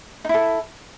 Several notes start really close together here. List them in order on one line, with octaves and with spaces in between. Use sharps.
D#4 E4 A4